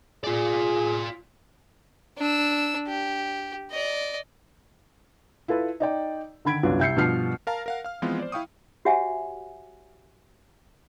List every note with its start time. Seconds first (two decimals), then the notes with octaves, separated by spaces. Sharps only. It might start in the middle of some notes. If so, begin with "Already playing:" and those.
0.24 F4 G#4 D5
2.18 D4 E6
2.87 G4
3.71 D5 D#5
5.48 E4 F4 A4 B4
5.80 D#4 D5 G5
6.45 D3 D#3 B5 G#6 D7
6.63 C2 F#2 B3 D4 F4 F#4
6.79 C2 E5 G6 C7 C#7
6.96 G2 B2 F3 D4 F6 C7
7.47 A#4 F5 A5 A#5
7.66 A#4 F5 F#5
7.84 F5 F6
8.02 E3 F3 G#3 B3 C4 F4
8.19 C5 D5
8.32 E4 F5 G5 C#6 D#6
8.85 F#4 G4 C#5 E5 F#5 G#5